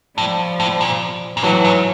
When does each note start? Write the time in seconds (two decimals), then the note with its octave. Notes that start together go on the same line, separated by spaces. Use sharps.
0.18 A2 F3 G3
0.60 A2
0.81 A#2
1.37 A#2
1.43 A2 E3 F#3
1.65 G#2